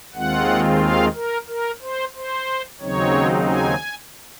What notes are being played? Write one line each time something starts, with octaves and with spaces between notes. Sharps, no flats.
D#2 D#3 G#3 C4 F4 F#5
F5
A#4
A#4
C5
C5
D#2 C#3 F#3 C4 D#4 C#5
G#5